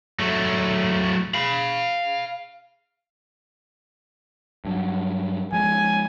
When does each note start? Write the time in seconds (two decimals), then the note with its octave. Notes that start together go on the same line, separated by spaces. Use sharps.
0.19 F#3 A3
1.34 F5 B5
4.65 G2 F#3
5.53 F3 G#3 G#5